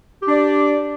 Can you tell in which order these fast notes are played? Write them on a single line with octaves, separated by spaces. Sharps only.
G4 D4 D5